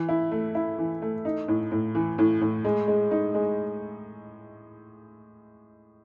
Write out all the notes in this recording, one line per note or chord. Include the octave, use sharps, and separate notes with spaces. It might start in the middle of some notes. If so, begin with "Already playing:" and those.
Already playing: E3
E4
A3
E4
E3
A3
D#4
A2
A2
E3
A2
A2
G#3
G#3
D#4
G#3